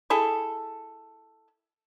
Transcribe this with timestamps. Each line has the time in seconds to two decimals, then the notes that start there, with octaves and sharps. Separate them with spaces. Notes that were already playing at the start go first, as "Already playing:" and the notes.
0.10 E4 G#4 A4